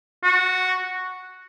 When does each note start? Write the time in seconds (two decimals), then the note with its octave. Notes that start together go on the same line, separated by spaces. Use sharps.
0.23 F#4